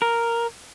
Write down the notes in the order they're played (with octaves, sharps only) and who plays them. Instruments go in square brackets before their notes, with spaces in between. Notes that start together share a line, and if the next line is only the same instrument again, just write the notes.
[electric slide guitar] A#4